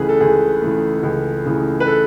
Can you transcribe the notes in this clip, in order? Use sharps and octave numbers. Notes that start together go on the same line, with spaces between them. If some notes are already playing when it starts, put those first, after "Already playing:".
Already playing: C#2 C#3 E3 A3 G#4 B4
A4
C#2 G#4
C#3 E3 A3
C#2
C#3 E3 A3
B4
A4